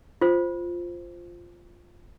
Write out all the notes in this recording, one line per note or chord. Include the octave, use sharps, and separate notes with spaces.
F4 C5